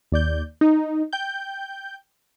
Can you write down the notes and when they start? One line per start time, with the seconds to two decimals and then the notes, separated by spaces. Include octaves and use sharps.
0.12 D#2 D5 G6
0.61 D#4
1.13 G5 G6